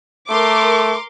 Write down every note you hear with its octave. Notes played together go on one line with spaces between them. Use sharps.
A3 A#4 C6 D6